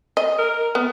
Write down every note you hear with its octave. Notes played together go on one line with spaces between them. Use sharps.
D#5
A#4
B3